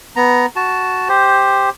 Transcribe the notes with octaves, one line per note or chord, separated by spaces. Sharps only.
B3 A#5
F#4 A5
G4 C5